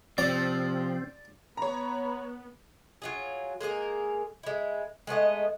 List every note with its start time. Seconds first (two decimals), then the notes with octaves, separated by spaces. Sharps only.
0.18 C3 F3 C4 D5
1.57 B3 C#5 A#5 B5
3.02 F#3 F4 G#4
3.61 G#3 A#3 G#4 A#4
4.43 G#3 E4
5.07 G#3 A3 B3 D#5